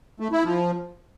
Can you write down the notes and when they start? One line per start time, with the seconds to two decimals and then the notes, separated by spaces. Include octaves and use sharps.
0.20 A3
0.32 E4
0.44 F3